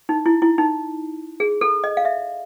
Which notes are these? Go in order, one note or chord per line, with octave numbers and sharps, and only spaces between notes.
D#4
E4
E4
D#4
G#4
A4
D#5
F5
E5